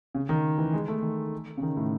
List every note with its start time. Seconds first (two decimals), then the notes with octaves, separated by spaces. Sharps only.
0.15 C#3
0.29 D#3
0.58 E3
0.73 G#3
0.88 A3
1.03 D#3
1.58 C#3
1.62 D#3
1.77 A2